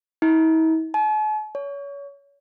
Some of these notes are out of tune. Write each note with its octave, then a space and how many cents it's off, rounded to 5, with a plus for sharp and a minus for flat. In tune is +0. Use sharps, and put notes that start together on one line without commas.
E4 -45
A5 -45
C#5 +30